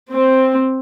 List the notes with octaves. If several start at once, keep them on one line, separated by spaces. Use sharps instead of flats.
C4